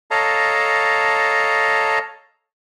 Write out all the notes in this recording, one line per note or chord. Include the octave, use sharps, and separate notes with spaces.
A4 C#5 D#5 F5 A5 A#5